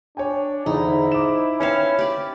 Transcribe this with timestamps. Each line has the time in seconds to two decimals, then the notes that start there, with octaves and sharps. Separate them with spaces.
0.17 D4 C#5 G5 G#5
0.66 E2 G#2 D3 D#4 E4
1.12 D6 E7
1.60 C#4 B4 C5 E5 F5 G5
1.99 G4 D5